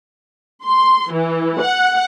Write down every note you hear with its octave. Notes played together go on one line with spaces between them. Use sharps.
C6
E3
F#5